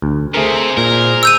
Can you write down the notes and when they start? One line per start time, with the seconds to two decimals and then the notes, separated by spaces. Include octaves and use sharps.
0.02 D2
0.34 C3 A3 G#4 A#4 C5
0.77 A#2 A#4
1.23 E6 G6 D#7